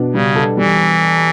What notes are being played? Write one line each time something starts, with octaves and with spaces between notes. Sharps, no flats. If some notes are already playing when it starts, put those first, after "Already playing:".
Already playing: B2 D4
C#3 G3
A4
E3 G3